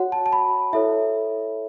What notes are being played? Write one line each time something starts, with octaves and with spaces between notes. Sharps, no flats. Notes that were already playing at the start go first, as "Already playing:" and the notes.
Already playing: F#4 C#5 F#5
A5
A5
B5
E4 A4 C#5 E5